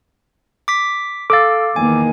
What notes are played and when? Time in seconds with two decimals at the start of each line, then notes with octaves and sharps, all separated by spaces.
0.68 D6 B6
1.30 A4 F5 D6 E6 A6
1.76 E2 D#3 A#3 G#5